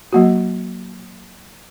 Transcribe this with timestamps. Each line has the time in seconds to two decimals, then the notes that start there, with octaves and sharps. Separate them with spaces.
0.13 F#3 A#3 F#4